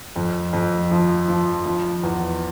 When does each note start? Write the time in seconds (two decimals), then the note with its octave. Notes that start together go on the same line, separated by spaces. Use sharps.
0.16 F2
0.53 F2
0.91 F3
1.28 F3
1.66 F3
2.03 E2